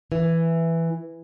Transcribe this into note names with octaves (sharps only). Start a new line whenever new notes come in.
E3